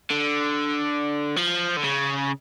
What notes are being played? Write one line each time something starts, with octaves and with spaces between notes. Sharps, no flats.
D3
F3
D3
C#3